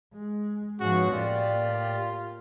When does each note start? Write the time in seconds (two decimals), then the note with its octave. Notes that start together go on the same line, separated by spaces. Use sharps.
0.13 G#3
0.80 G#2 B2 F3 C#4 F#4 G#4
1.11 A2 A#3 F4 G4 D5